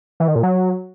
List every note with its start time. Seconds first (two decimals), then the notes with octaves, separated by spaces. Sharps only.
0.20 E3
0.28 D#3
0.35 A#2
0.43 F#3